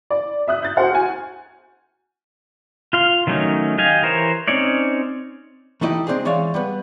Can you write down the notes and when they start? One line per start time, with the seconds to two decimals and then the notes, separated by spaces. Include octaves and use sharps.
0.10 D5
0.48 E5 D#6 F#6
0.62 G6 A6
0.76 F#4 C5 F#5 F6
0.91 F#4 G#5
2.93 F4 F5 C6
3.27 D#3 F#3 A3 C#4 D#4
3.78 G4 D#5 F5 G#5
4.03 E3 A#4 C5 C#5
4.48 C4 C#4 D#4 C#5 D5
5.81 E3 A3 D#4 E4 G4 D#5
6.07 G#3 C4 D4 D#4 G#4
6.25 E3 G#3 C#5 D5 F5
6.54 G3 B3 B4